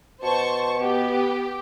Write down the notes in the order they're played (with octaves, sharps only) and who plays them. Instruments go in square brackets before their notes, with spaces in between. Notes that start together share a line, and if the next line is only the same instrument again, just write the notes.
[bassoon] B2 [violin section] C5 A5 C#6
[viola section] B3 [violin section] G4